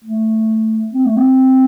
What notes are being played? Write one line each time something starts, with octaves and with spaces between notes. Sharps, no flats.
A3
C4
A3
C4